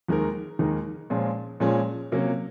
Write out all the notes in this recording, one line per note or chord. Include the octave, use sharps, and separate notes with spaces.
D#2 D#3 G#3 D#4 A#4
D#2 D#3 G#3 D#4 A#4
A#2 F3 G#3 C#4
A#2 F3 G#3 C#4
C3 F#3 A#3 C#4